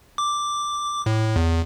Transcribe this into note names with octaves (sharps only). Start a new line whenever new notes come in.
D6
A2
E2